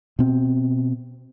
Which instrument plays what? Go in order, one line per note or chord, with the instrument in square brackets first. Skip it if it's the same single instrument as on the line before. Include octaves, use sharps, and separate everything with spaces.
[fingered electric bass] B2 C4